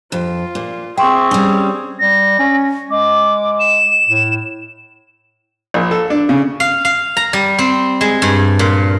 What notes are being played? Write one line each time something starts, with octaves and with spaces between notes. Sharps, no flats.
F2 F4
A#2
C4 G#4 E5 G5 C6 C#6
G3 C#4
G3 A#6
C#4
G#3 D6
E7
A2
A#1
A4
D4
C#3
F5
F5
A#5
G3
C4
G#3
G2
A#2